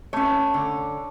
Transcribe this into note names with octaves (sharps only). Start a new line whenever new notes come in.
A3 C#4 C#5
D3